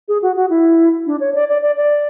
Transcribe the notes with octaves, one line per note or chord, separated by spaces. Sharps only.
G#4
F#4
F#4
E4
D4
C#5
D5
D5
D5
D5